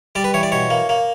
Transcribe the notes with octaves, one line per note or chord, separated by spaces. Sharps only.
G3 D5
B4
E3 C#5
D5
B2 C#5
A#3
A#3